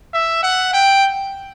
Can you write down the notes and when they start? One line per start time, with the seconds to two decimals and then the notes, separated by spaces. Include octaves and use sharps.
0.14 E5
0.43 F#5
0.73 G5